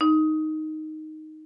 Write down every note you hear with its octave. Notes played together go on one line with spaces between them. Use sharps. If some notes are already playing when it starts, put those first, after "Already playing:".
D#4